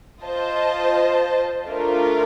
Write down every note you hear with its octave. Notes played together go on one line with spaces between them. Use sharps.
F4 C5 D#5 A5
A3 D4 F4 A#4